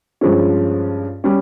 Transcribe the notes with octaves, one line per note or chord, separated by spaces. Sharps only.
G2 F3 G#3 C#4
G3 C#4